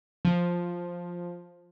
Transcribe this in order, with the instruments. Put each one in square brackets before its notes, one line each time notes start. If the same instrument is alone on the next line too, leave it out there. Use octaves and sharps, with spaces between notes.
[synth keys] F3